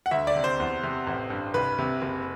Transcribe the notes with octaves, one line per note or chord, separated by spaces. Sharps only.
F#5
D2 E5
D5
C3
C5
E2
C3
A1
G2
C2 B4
C3
F#1